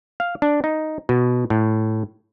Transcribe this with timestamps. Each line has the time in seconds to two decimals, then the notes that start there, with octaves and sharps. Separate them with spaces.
0.20 F5
0.42 D4
0.64 D#4
1.09 B2
1.50 A2